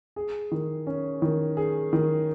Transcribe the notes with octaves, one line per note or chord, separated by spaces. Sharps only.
G#4
D#3
C#4
D#3
G#4
D#3